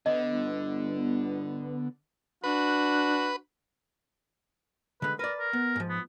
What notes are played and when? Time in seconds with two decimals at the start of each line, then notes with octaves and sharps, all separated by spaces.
0.06 D3 B3 D#5
0.33 G1
2.44 D4 F#4 B4
5.02 D3 G#3 B4
5.19 A#4 B4 D5
5.38 A#4
5.53 B3
5.76 G#2 F3
5.89 B3